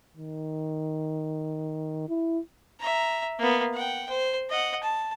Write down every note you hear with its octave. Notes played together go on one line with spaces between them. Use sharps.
D#3
E4
E5 A#5
A#3 B3
F#5 G5
C5
D#5 F#5
A5